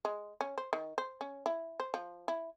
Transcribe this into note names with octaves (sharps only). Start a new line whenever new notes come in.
G#3
C#4
C5
D#3
C5
C#4
E4
C5
F3
E4